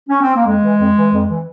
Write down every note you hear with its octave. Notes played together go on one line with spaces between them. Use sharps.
C#4
C4
A#3
F2 G#3
E3
F2
E3
F2
E3